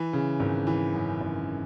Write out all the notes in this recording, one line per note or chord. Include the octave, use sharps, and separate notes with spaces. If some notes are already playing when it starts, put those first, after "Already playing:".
Already playing: E3
C#3
G#1
E3
F#2
G#1